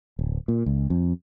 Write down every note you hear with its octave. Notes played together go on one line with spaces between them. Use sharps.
D1
A#2
C#2
F2